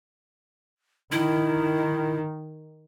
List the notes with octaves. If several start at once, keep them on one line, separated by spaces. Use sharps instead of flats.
D#3 E4